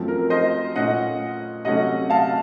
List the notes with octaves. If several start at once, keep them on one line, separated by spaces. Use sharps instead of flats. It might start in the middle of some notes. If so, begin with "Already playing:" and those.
Already playing: F#2 F3 A3 C4
A#4
C5 D#5
A#2 A3 C#4 F4 D#5 F#5
C3 F#3 A3 C#4 D#5 F#5
F5 A5